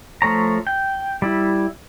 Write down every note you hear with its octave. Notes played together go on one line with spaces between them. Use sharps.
F3 A3 C#5 A#5
G5
G3 E4